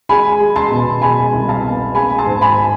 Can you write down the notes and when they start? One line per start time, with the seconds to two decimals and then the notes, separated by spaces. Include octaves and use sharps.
0.09 G#3 G#5 B5
0.40 G#3
0.56 A5 C6
0.71 B2
1.02 G#3 G#5 B5
1.34 C2
1.48 F5 A5
1.64 B3
1.95 G#3 G#5 B5
2.18 A5 C6
2.26 G#2
2.41 G#5 B5